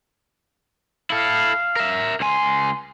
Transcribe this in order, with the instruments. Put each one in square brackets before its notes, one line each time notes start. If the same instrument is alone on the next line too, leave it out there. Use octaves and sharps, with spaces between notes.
[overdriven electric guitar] E4 A4 [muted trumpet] F5
[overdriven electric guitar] A#4 E5
[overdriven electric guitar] C#2 G#5 [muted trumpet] C6